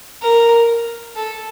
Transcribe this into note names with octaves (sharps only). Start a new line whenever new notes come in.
A#4
A4